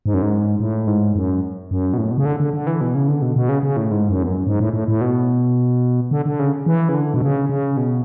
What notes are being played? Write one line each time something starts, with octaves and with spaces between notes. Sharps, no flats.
G#2
F#2
G#2
A2
G#2
F#2
F#2
B2
A2
B2
C#3
D3
D3
D3
E3
B2
C#3
D3
B2
B2
C#3
C#3
A2
G#2
F#2
E2
F#2
G#2
A2
A2
A2
B2
D3
D3
C#3
E3
C#3
D3
B2
C#3
C#3
B2